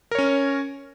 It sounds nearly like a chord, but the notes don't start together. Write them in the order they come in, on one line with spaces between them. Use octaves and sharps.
A#4 C#5 C#4